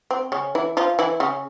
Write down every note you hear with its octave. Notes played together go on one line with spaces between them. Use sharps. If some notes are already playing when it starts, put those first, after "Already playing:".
C4
C#3 C#4
E3 E4
F3 F4
E3 E4
C#3 C#4